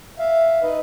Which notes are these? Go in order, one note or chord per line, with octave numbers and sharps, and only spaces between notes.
E5 F5
D#4 B4 D#5